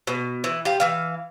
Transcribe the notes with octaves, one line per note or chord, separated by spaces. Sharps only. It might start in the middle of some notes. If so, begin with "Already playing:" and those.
B2
E3
F4 G4
E3 F5